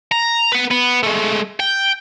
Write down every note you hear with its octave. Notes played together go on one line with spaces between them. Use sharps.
A#5
B3 B4
B3
G#3 A3
G5